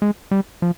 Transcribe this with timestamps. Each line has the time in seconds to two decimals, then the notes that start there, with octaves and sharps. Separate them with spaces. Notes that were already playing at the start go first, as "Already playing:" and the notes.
0.02 G#3
0.31 G3
0.62 F3